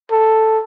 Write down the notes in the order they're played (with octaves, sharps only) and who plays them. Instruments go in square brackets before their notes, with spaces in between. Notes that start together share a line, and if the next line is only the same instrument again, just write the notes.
[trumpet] A4